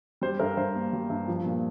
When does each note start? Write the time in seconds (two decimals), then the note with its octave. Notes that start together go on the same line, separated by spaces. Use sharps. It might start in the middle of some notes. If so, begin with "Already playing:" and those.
0.21 G3 C5
0.39 G2 A#4
0.57 G2 C5
0.75 A#3
0.93 G3
1.10 G2
1.28 F3
1.46 A#2